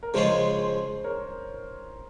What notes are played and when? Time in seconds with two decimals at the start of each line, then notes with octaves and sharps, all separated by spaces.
0.03 A#4
0.14 C#3 F3 G#3 C#4 F4 C5
0.59 C5
1.04 A#4 C#5